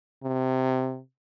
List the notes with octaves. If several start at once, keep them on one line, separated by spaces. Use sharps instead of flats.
C3